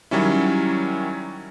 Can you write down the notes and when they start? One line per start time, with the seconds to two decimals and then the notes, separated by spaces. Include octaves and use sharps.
0.11 D#3 F#3 G3 C#4 E4